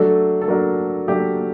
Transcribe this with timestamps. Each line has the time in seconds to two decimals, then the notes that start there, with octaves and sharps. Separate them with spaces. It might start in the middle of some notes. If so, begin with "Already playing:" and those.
Already playing: F#3 A3 D4 A4
0.42 A4
0.48 F#3 A3 D4 A#4
1.08 F#3 A3 D4 G4